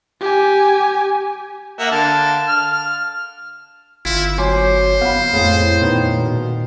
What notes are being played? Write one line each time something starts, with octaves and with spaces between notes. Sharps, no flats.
G4 G#5
A#3 E5 F#5
D3 F5 A5
F6
G1 E4 F4
F#3 C5 G#5 C6 D6
B3 F5 F#5 B5
F2 A2 G#4 F5
A#2 D#3 B3
B2